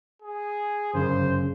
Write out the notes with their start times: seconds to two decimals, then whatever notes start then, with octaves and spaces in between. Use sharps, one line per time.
0.22 G#4
0.94 G1 F#2 C#3 C5